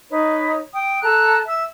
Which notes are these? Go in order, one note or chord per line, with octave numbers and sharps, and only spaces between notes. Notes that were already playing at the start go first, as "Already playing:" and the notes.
D#4 B4 C#5
G5 D#6
A4 A#5 F#6
E5 E6